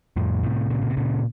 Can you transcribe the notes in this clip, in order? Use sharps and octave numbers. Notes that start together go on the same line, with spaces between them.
F2 A2
A2 C3
A#2 C#3
A#2
C3
A#2 C#3